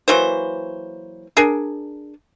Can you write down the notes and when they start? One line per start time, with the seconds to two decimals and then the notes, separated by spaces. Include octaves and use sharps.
0.08 E3 F#3 A#3 C5
1.37 D4 G#4 A#4